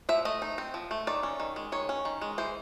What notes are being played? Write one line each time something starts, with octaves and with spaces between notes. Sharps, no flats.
F3 E5
A3 D#5
D#4
C4
F3
A3
D#3 D5
C#4
D#3
G#3
D#3 C#5
C#4
D#3
G#3
E3 C5